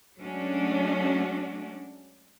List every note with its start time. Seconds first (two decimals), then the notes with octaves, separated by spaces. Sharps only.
0.17 F#3 G#3 A3 C#4 D4 F#4